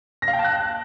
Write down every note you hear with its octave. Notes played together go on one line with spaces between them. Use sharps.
A#6
F5
G5
A5
F#6